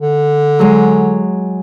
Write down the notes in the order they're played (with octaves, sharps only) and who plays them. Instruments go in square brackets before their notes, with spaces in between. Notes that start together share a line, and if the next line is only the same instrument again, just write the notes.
[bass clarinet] D3
[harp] F#3 G#3